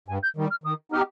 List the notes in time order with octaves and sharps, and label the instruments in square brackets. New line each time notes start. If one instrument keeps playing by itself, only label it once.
[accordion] G2 [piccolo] G#5
[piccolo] G6
[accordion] D#3 G3
[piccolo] F6
[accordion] D#3 [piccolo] D#6
[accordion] B3 D#4 G4 [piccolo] F6